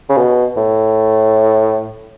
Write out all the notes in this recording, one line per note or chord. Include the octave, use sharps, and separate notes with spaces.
C#3
B2
A2